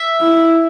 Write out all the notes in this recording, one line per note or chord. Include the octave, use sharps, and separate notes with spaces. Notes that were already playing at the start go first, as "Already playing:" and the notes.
Already playing: E5
E4